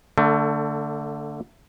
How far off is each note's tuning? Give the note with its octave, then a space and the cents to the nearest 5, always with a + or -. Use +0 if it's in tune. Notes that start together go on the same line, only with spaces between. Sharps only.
D3 +0 A3 +25